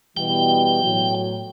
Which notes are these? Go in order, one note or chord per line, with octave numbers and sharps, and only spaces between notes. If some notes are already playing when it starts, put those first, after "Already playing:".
B2 E3 G3 G5
A2 F#3